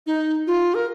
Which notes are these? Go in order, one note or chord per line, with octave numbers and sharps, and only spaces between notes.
D#4
F4
A#4